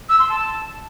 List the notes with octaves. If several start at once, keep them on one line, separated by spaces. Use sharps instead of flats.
E6
C6
A5